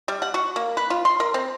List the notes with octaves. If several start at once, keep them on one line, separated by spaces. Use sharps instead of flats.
G3
F#5
F#4
A#3
B4
F4
C6
A#4
C4